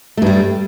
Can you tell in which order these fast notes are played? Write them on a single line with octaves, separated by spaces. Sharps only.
A3 G2 G3